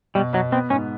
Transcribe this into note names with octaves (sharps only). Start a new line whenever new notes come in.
B2 G3
B2 F#3
B3 C4
G#2 C#4